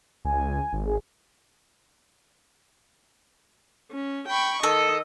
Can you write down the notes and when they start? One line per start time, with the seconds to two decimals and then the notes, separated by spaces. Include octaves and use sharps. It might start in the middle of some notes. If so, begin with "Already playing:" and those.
0.25 C#2 G#5
0.73 G#1
0.86 G#4
3.92 C#4
4.30 G5 B5 C#6
4.63 D#3 A4 D#5